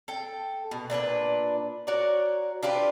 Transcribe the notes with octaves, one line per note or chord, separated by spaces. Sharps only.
A4 G5
B2
A#2 D4 A4 B4
F#4 A#4 C#5 D5
D4 F4 G4 B4